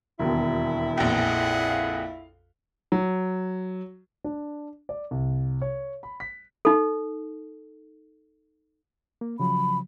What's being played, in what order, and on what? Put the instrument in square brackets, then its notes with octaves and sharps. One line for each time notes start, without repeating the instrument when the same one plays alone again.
[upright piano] E1 D#2 B2 [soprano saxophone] E4
[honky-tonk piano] A#1 F2 [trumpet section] G#4 B4 F#5
[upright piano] F5
[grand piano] F#3
D4
D5
C2
C#5
B5
B6
[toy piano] D#4 A4
[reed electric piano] A#3
[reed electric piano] C#3 F3 F#3 [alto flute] B5